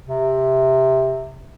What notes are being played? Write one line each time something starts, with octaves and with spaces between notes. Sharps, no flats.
C3